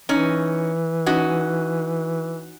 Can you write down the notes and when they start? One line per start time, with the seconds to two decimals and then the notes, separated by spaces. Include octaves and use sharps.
0.09 E3 C#4 D#4
1.06 C#4 D#4 F#4